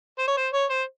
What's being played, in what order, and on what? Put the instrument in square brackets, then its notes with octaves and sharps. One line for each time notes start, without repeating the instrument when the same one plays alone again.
[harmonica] C5
C#5
C5
C#5
C5